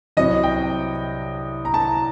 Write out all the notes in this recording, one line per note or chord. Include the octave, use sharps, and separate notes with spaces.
C2 C3 F#3 C4 D#5
G5
A#5
A5